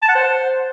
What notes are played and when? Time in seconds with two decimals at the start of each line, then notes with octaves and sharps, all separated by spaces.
0.02 A5
0.09 F#5
0.15 C5